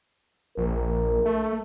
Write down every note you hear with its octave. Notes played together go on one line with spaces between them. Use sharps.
A#1 A#4
A3